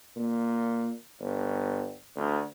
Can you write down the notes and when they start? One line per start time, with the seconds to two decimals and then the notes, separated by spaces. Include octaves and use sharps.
0.16 A#2
1.20 G1
2.16 D2